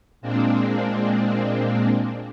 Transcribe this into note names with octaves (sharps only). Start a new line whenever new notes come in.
A#2 G#3 A#3 C4 D4